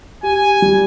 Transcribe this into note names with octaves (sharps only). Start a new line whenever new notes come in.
G4 G#5
G3